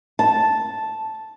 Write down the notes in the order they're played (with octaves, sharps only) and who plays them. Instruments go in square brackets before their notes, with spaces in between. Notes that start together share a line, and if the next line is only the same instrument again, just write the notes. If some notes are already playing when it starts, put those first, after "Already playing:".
[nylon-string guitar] A5